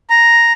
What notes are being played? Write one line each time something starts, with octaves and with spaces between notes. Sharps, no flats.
A#5